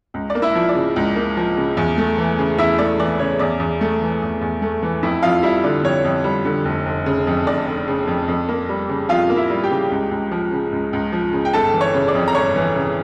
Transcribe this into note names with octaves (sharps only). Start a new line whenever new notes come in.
C#2
D5
A#3
E4 E5
F3
D5
C#3
C#2
A#3
F3
C#3
E2
A3
E3
C#3
E2 E4 E5
A3 D5
E3 D5
C#3 C#5
E2 D5
E2
A3
E3
E2
E2
A3
E3
F2 E4 E5
F2 F4 F5
G3 E4 E5
D3 D5
F2 C#5
F2
G3
D3
F1
F1
C#3
F2
F1 D5
F1
C#3
F2
F2
A#3
G3
C#3
F2 F4 F5
A#3
E4 E5
G3
G4 G5
C#3
C#2
C#2
F3
C#3
C#2
C#2
F3
C#3
G5
G1 A4 A5
E3
C#5 C#6
C#3
D5 D6
F2
A#5
G1 C#5 C#6
E3
C#3